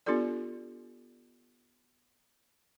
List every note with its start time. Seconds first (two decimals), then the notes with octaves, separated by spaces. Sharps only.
0.06 B3 D4 F4 G4 A4 D5